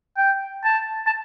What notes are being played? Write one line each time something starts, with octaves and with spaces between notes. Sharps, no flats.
G5
A5
A5